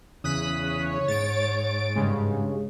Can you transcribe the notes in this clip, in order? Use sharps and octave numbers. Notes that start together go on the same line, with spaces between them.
E2 C#3 D#6 F#6 B6
C#5
G#2 A6 D7
G2 C#3 G#3